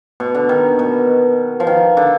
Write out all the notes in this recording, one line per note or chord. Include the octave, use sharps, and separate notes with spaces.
B2
D3
D#3
B2
F3
D#3
D3